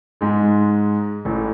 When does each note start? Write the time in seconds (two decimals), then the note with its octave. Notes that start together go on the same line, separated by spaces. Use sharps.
0.21 G#2 G#3
1.25 A1 A2